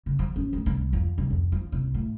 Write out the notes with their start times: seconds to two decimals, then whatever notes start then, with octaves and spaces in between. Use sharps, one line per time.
0.06 C#3
0.19 F3
0.36 C#4
0.53 D2
0.66 C2
0.93 F2
1.18 C2
1.30 F2
1.52 F3
1.72 C2
1.94 A2